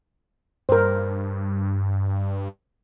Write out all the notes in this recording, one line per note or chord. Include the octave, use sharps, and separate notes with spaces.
G2 A#4 C5